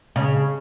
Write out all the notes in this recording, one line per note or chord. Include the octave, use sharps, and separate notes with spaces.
C#3